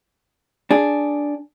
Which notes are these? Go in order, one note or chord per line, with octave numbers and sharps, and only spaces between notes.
D4 G#4